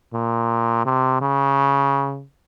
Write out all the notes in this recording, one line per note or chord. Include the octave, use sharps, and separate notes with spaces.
A#2
C3
C#3